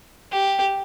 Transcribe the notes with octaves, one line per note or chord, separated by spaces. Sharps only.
G4